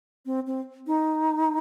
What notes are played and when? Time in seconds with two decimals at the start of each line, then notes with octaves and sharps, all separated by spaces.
0.26 C4
0.47 C4
0.87 D#4